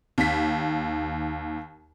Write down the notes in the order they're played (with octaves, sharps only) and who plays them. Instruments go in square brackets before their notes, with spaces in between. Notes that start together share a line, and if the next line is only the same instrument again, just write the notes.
[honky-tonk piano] D#2 B6